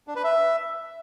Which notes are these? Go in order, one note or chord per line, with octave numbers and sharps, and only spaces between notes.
D4
B4
E5